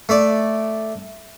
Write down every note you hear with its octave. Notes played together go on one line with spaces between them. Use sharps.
A3 D5